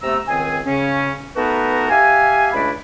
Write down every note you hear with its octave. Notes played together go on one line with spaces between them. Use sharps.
C3 A3 B3 A#5 E6
C#2 D#3 C4 G#4 G#5
C#3 C#4
A3 B3 D#4 F#4 A#4 B4
G4 E5 F5 G#5
C#2 A3 D4 E4 D5 B5